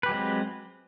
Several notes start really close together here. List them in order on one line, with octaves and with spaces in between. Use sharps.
B4 G4 F#3 G#3 C4